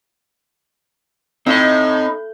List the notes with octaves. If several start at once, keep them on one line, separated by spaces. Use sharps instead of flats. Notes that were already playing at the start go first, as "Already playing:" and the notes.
A2 C4 D#4 D#5